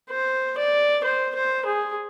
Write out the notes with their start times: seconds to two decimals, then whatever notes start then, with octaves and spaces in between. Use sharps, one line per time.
0.11 C5
0.58 D5
1.04 C5
1.35 C5
1.66 G#4